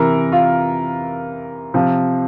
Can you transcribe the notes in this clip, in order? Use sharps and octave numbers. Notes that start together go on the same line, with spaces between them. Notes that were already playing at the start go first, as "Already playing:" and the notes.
Already playing: C3 E3 A#4
F4
C3 F3